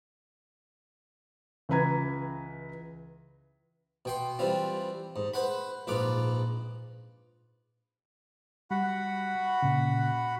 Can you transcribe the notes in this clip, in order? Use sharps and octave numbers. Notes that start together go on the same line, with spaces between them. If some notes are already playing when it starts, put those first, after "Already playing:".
C#2 E3 B4 A#5 G#6
B2 G5 C6
E3 G3 C4 F4
G#2
B4 C5 F#5 B5
A#1 G#2 F4 B4 D6
G3 F#4 F#5 B5
A#2 C#3